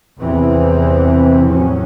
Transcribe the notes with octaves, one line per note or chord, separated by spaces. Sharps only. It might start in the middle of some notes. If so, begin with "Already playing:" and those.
E2 C3 E3 C4
A2 F#3 C#4